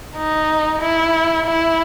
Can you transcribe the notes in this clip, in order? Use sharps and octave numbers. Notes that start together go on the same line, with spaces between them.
D#4
E4
E4